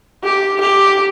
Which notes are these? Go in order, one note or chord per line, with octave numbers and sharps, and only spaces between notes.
G4
G4